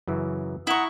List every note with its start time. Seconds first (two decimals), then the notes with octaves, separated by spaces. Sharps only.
0.08 F#2 C#3 E3
0.67 E4 F#5 A#5 C#6 D#6